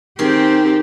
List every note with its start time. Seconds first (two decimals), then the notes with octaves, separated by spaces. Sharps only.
0.19 D#3 C4 G4 G#4